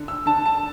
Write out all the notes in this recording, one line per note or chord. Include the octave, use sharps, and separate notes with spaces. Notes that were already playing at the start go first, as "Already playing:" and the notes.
Already playing: D3
E6
D3 A5
A5